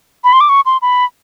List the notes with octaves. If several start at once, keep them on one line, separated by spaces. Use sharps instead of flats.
B5
C6
D6
C#6
C6
B5